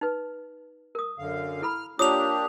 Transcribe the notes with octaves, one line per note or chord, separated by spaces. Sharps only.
D#4 B4
A#4 D#6
F#2 D3 F5
E4 A4 B5 F6
A#3 D4 F4 G4 C#5 D6 D#6 F7